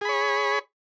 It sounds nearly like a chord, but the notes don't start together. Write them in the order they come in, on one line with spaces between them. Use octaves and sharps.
G#4 B5 C#5